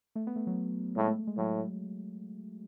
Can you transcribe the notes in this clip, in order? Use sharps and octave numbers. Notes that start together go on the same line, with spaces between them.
A3
B3
A3
F#3
A2 G#3
A3
G#3
A2 F#3